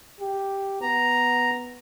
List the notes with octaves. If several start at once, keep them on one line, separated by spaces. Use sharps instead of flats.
G4
B3 A#5